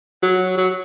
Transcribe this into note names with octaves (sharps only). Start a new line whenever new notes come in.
F#3
F#3